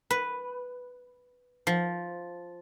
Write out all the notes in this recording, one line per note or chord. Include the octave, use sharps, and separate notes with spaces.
B4
F3